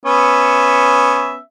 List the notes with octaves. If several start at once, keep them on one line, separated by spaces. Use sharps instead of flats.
B3 C#4 E5